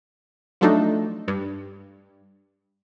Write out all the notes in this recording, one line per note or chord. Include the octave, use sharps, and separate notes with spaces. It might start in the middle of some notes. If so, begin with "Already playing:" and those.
F3 F#3 A3 D4 D#4
G2